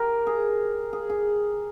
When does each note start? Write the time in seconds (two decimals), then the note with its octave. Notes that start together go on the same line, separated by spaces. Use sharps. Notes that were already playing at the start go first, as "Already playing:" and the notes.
Already playing: G4 A#4
0.27 G#4
0.93 G#4
1.10 G#4